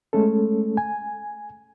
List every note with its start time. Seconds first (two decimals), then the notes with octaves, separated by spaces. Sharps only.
0.13 G#3 A3 C#4 A4
0.77 G#5